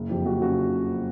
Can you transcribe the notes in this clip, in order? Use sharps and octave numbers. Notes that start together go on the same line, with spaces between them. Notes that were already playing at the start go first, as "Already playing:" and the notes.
Already playing: F#1
F2 G4
F#1 F#4
C#3 F#4